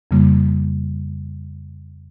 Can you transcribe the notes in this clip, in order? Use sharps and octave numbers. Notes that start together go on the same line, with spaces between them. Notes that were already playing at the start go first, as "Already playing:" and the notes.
F2 C#3 G3 A#3